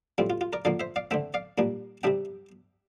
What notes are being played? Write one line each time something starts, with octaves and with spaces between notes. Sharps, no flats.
A2 G3 C4 F4
F4
F4
A#4 D5
D3 F3 A#3 D5 F5
C5 E5
D5 F5
D3 A3 C4 E5 G5
D5 F5
A#2 G3 A#3 D4
C3 G3 D4 E5 G5